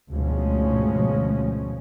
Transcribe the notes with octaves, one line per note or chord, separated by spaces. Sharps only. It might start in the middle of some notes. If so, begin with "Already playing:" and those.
D2 G#2 B2 F3 G#3 C#4